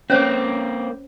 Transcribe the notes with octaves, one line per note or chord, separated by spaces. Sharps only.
A#3 C4 C#4 C5 C#5